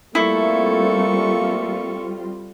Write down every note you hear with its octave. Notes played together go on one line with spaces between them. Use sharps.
G3 A3 A#3 C4 E4 F4 A4 C#6